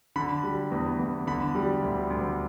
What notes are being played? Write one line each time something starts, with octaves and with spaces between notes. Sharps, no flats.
D3 B5
G3
E2
E2
D3 B5
G3
D2
D2